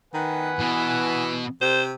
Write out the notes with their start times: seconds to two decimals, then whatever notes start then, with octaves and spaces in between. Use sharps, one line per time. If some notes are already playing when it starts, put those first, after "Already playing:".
0.14 D#3 B4 F#5 G#5
0.59 B2 E3
1.61 C3 C5